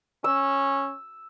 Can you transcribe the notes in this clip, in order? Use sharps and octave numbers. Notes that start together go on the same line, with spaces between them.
C#4 E6